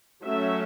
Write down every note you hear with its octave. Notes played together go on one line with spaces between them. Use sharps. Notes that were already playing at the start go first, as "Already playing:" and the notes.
F#3 A3 C#4 E5